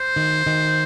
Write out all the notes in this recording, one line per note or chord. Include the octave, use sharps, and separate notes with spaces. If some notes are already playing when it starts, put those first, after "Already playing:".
Already playing: C5
D#3
D#3